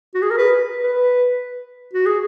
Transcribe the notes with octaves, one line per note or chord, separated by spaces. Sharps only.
F#4
G#4
A#4
B4
B4
F#4
G#4